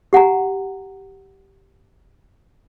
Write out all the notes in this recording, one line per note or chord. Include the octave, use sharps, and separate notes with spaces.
G4 F#5 G#5 A#5